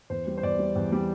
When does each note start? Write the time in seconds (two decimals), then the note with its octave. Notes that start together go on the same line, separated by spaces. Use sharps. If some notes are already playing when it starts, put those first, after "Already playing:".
0.10 E2 C5
0.27 G3
0.37 C5
0.43 E2 D5
0.59 G3
0.76 E2
0.92 G3